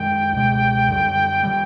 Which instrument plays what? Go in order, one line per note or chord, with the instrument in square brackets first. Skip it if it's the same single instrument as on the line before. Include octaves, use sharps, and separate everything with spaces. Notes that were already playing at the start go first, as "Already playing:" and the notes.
Already playing: [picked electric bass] F#2 D#3 G#3 [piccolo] G5
[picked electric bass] C#2 B2 G#3
F#2 D3 G3
D#3 G3